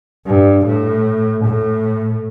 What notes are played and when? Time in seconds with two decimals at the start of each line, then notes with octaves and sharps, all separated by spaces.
0.26 G2
0.66 A2
1.44 A2